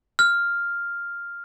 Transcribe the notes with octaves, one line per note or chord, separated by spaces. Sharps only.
F6